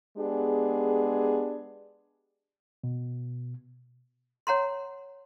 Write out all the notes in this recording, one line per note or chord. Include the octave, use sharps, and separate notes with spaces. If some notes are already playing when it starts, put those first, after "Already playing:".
G#3 B3 D4 G4 G#4
B2
C#5 F#5 A#5 C6